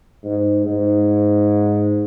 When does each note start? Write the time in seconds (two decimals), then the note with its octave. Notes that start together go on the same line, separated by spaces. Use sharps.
0.24 G#2
0.66 G#2